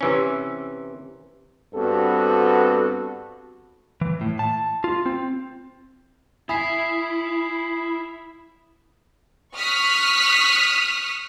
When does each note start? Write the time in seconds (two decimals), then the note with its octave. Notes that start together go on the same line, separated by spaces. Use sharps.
0.01 C3 E3 C#4
1.75 G2 B3 C4 F#4 A4
4.01 E3
4.21 A2
4.39 A5
4.84 F4
5.06 C4
6.49 E4 E5 G#5 B5 D#6 B6 C7
9.55 C#6 D#6 F6 F#6 B6